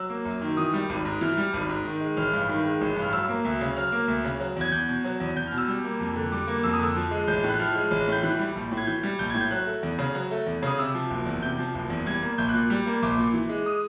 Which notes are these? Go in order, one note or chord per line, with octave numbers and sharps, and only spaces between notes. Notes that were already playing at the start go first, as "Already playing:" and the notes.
Already playing: F#3 E6
A#3
F#2
D#3
E3 D#6
G3
G#1
G#2
E3 F6
G3
G#1
G#2
D#3
G#3
A1 F6
G2
D#3
G#3
A1
G2
F6
F#3 E6
A#3
D2
C#3
F#3 F6
A#3
D2
C#3
F#3
E2 G#6
E2 G6
B2
F#3
E2
E2 G6
B2 F6
E6
G3
A#3
F2
D3
G3 D6
A#3
F2 E6
D#6
D3 E6
F3
G#3
A1 G6
A2
F#6
F3 F6
G#3
A1
A2 G6
E3 F#6
G3
A#1
A2
G#6
E3 G6
G3
A#1 G6
A2 G#6
G6
F#3 F#6
A3
E2
C#3
F#3
A3
E2
C#3 D#6
C3 E6
F3
F#1
E2
C3 G6
F3
F#1
E2
G3 G#6
A#3
A#1 G6
F#6
A#2
G3
A#3
A#1 D6
A#2
E3
G#3
D#6